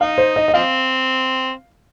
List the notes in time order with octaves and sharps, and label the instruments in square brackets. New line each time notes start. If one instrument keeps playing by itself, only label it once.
[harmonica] D#4 [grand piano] F5
[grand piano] C5
D#5
D#5
[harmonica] F3 C4 [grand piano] F5